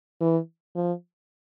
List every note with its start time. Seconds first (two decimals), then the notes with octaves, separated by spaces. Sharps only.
0.21 E3
0.75 F3